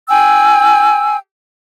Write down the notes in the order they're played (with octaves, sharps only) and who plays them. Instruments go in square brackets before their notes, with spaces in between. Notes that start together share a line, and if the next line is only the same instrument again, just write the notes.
[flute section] G5 G#5 E6